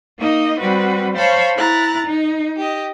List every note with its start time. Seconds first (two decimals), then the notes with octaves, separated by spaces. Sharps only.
0.19 A#3 D#4 D#5
0.59 G3 C4 F#4 B4
1.15 C5 C#5 F5 A5 B5 C#6
1.56 E4 A#5 F#6 A6
2.07 D#4
2.57 G4 D#5